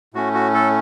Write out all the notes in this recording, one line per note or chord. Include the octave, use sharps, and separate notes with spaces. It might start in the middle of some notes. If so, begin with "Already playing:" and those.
A2 A3 C#4 F#4
F#4
A4